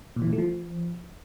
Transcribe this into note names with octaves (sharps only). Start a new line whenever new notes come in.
A#2
E3
A#2
A3
F3